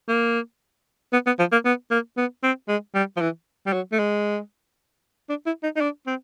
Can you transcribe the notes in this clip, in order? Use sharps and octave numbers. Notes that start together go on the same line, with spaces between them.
A#3
B3
B3
F3
A#3
B3
A#3
B3
C4
G#3
G3
F3
E3
G3
F#3
A3
G#3
D4
E4
D#4
D#4
D4
C4